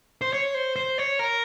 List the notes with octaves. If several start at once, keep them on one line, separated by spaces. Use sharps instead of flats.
C5
C#5
C5
C5
C#5
A#4